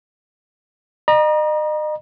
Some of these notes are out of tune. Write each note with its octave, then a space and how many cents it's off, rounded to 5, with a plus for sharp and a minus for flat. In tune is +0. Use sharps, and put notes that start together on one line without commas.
D#5 -35 A#5 +35